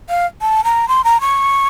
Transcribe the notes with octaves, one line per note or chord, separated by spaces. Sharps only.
F5
A5
A#5
C6
A#5
C#6